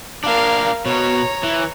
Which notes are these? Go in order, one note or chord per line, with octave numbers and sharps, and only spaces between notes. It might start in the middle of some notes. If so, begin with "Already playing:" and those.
A#3 D4 A#4 F5
B2 C#5 A#5
E3